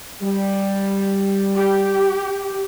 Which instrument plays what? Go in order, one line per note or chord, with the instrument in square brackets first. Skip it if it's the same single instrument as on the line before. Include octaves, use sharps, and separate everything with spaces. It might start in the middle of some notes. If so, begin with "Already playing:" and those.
[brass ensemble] G3
[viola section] G4